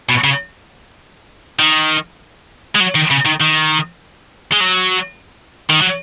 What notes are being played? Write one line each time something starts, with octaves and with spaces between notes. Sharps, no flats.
B2
C#3
D#3
G#3
F#3
D#3
C#3
D#3
D#3
G#3
F#3
D#3
F#3